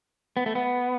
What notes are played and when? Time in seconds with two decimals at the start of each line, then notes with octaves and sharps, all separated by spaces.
0.37 B3
0.46 A3
0.55 B3